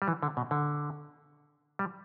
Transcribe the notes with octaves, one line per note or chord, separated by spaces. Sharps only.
G3
E3
D3
B2
D3
G3